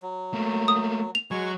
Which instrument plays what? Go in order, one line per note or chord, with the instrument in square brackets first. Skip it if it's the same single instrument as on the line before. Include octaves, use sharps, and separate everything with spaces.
[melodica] F#3
[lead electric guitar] A3 A#3
[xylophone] D#6
F7
[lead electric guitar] F#3 [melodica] G#3 G#5 C#6